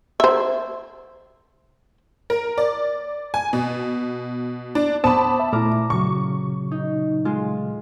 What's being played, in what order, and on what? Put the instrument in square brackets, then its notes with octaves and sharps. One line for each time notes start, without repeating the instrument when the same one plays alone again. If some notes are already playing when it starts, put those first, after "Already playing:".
[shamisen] C5 E5
[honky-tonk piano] A#4
D5
G#5
B2
D4
[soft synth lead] B3 [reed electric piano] C5 D6 [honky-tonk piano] A5 B5 [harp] D#6
[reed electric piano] E5
[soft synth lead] A#2 [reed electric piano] A3 E4 [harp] A#5 D6 F6
[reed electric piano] C#3 F#3 [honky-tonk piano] C#6
[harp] D#4
G#3 F4